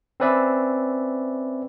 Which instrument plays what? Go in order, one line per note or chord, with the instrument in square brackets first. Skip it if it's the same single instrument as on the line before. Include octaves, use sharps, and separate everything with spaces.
[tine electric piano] C4 C#4 B4 D5 E5